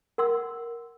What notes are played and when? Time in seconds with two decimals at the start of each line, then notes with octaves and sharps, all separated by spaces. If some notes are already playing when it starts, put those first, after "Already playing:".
0.18 A#4 F#5 C6 E6